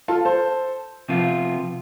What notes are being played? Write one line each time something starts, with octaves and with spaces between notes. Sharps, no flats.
F4 A4
A4 C5
C3 F3 B3 F4